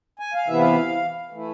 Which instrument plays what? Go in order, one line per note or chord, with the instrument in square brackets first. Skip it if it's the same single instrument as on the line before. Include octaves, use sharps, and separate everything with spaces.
[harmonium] G#5
F5
C3 E3 B3 E4 E5
F5
E3 A3 E4